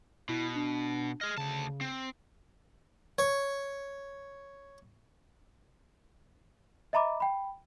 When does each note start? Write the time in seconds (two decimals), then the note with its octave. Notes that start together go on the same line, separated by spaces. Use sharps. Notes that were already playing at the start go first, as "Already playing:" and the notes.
0.29 B2 E4
0.55 D4
1.21 G#4 D#5 F6
1.38 D2 C#3 A5
1.81 C4
3.18 C#5 C#6
6.93 D#5 E5 A#5 B5 D6
7.20 G5 B5